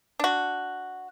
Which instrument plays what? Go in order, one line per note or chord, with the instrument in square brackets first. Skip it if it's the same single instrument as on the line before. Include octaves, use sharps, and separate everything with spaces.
[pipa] D4 F#4